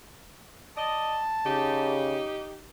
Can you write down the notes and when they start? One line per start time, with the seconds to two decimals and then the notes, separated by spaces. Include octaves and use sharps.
0.77 D5 D#5 A5
1.46 C#3 D#4 G4